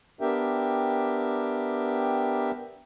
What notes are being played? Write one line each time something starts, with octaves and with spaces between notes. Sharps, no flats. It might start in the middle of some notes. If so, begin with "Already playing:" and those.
B3 D4 G4 A#4 E5 G5